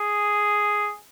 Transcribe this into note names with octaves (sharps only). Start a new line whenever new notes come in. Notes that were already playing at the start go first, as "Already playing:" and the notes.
Already playing: G#4